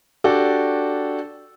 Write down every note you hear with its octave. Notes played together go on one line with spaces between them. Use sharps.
D4 F#4 G4 A4